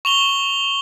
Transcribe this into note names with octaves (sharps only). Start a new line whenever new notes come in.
C#6 F7 G7